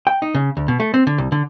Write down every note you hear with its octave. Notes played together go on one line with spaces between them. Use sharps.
G5
D#4
C#3
D2
B2
A3
C4
D3
C2
D3